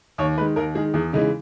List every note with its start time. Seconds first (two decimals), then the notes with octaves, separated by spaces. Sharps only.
0.18 D#2 C#5
0.38 D#3 G#3 B4
0.56 D#2 A#4
0.75 D#3 G#3 G#4
0.94 E2 G#4
1.13 C#3 E3 G#3 D#4